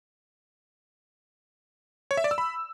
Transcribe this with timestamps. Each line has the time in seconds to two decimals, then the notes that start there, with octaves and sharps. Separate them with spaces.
2.11 C#5
2.17 E5
2.24 D5
2.31 E6
2.38 B5